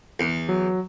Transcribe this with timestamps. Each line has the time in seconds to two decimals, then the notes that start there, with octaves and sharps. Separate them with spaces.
0.20 E2
0.49 F#3